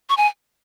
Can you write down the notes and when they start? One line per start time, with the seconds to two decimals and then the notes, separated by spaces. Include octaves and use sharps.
0.09 C#6
0.17 G#5